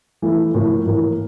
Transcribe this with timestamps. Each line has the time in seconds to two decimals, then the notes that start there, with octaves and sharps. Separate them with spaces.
0.22 E3 A3 E4
0.54 A2 F3 A#3
0.86 A2 E3 A#3